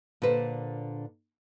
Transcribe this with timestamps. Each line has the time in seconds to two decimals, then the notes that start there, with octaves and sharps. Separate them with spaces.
0.22 A#2 D3 B4 C5